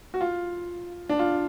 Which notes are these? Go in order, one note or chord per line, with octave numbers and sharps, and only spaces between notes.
F#4
F4
D4
F4